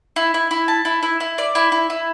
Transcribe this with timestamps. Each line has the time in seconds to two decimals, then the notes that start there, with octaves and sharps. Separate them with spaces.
0.16 E4
0.34 E4
0.51 E4
0.68 A5
0.85 E4
1.03 E4
1.20 E4
1.38 D5
1.55 E4
1.72 E4
1.90 E4